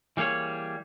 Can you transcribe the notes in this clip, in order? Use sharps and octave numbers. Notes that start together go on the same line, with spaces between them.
E3 G3 A#3 G#4 C#5